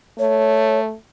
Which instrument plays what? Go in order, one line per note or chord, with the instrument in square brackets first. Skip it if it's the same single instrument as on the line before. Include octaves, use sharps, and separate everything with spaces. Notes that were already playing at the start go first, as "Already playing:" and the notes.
[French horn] A3 [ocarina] C#5